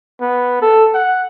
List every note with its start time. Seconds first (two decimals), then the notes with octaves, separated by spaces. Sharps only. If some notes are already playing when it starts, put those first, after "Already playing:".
0.21 B3
0.62 A4
0.94 F#5